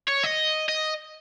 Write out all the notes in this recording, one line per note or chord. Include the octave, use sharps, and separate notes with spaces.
C#5
D#5
D#5